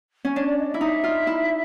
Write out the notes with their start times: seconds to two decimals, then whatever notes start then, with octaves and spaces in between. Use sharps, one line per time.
0.25 C#4
0.35 D4 C#5
0.47 D5
0.59 D#5
0.69 D#5
0.74 E4
0.81 D#4 E5
1.04 F4
1.27 E4